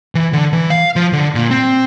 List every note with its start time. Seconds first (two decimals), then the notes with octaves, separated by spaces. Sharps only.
0.15 E3
0.33 D3
0.53 E3
0.70 F5
0.96 F3
1.13 D3
1.35 A#2
1.51 C4